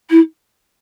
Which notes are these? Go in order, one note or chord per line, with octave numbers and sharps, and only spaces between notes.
E4